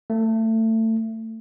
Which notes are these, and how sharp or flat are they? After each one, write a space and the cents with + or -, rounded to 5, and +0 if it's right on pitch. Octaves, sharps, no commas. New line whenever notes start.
A3 +25